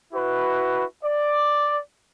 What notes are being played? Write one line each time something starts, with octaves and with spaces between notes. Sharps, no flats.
E4 F#4 B4
D5